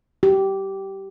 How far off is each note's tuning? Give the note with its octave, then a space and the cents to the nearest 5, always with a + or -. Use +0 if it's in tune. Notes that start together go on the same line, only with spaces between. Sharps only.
G4 -15